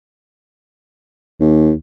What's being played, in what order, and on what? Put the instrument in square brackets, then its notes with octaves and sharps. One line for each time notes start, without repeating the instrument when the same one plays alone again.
[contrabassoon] D#2